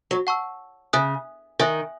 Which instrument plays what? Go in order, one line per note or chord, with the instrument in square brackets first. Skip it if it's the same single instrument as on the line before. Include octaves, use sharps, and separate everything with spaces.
[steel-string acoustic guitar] F#3
[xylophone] F#5 A5 C#6 E6
[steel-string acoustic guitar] C#3 [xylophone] E5 G#5 D#6 F#6
[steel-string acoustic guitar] D#3 [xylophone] E5 G#5 D#6 F#6